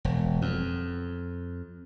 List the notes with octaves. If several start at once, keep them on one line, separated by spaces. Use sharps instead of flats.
E1
F2